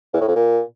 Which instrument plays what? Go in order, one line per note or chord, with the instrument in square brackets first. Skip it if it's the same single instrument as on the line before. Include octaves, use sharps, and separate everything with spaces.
[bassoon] E2
A2
F2
A#2